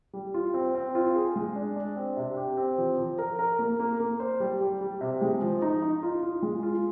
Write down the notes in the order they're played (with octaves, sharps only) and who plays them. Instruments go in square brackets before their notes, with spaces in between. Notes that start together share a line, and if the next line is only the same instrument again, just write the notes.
[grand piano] G3
F4
C4
C4
F4
G#4
G#3
D4
D4
C4
C3
G4
C4
F3
F3
A#4
A#4
A#3
A#3
A#3
C5
G3
G3
G3
C3
G#3
F3
D#4
D#4
F4
F4
G#3
F4